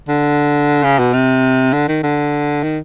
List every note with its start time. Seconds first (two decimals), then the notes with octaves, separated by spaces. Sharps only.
0.08 D3
0.84 C#3
0.99 B2
1.13 C3
1.73 D3
1.88 D#3
2.03 D3
2.63 D#3